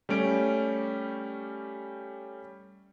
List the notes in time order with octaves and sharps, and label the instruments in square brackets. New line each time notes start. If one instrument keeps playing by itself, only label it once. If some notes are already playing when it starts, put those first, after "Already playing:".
[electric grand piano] G3 A3 C#4 D7